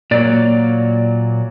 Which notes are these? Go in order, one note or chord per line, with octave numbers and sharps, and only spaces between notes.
A#2 F#3 A#3 D5